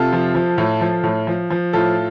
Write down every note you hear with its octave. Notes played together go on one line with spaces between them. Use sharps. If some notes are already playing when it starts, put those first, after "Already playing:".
Already playing: C3 F4 A4
F3
F3
A2
F3
A2
F3
F3
A2 F4 A4